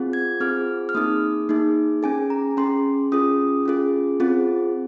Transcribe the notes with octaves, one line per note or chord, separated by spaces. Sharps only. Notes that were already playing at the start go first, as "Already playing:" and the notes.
Already playing: C4 F4 G#4
G#6
C4 F4 G#4 F6
F6
A#3 D#4 G#4 D#6
A#3 D#4 G#4
C#4 G#4 G#5
A#5
C#4 G#4 C6
C#4 F4 G#4 D#6
C#4 F4 G#4
C4 F4 G#4